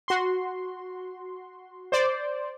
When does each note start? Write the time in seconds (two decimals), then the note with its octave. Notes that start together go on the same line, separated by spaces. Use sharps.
0.08 F#4 C6
1.92 C5 D5